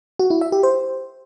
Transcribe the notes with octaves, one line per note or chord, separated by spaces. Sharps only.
F#4
E4
E5
G4
C5